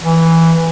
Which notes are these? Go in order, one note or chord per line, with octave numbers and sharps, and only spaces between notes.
E3